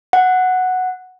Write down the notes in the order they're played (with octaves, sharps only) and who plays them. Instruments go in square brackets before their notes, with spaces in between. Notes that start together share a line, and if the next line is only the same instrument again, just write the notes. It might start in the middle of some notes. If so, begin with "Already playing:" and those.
[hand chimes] F#5